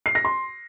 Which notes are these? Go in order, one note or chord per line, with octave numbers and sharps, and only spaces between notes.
C7
A#6
C6